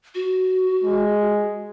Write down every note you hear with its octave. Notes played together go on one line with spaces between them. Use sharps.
F#4
G#3